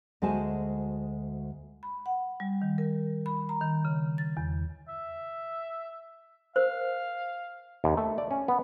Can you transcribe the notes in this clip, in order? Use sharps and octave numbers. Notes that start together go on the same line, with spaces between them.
D2 G#3 F#4 C5 G#5 A5
B5
F#5
G3
D#3
A#4
B5
A#5
D#3
C#3
A6
E2
E5
A#4 C5 F5
D#2
A3
D5
C#4
B3